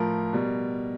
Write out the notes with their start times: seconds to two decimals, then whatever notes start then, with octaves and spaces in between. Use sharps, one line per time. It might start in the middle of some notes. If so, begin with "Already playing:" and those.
Already playing: A2 F3 A#4
0.33 B2 G3